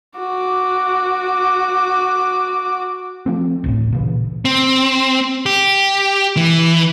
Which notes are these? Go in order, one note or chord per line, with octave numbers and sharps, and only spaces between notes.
F#4 D6
F3 A3 C4
D1 G#1 A2
A#2 C#3 E3
C4
G4
E3